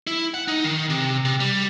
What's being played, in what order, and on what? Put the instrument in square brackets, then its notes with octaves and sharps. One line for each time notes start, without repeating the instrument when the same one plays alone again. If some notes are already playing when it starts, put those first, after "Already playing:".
[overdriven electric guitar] E4
F#5
D#4
D#3
C3
C3
G3